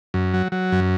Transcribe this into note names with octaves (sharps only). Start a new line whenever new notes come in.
F#2
F#3
F#3
F#2